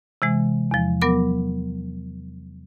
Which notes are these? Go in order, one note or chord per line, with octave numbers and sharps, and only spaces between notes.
C3 E3 G#3
E2 F3
F#3 B3 A#4 D6